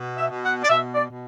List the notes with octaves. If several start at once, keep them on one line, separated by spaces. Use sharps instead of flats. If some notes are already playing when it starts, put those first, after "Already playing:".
Already playing: B2
E5
B2
F#5
D5
B2 E5
D5
B2